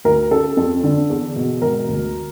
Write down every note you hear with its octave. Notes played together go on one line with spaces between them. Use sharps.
D2 A#4
C#3 A4
F2 A4
D3
E2
B2
E1 A#4
D2